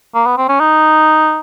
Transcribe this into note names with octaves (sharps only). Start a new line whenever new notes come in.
A#3
B3
C4
C#4
D#4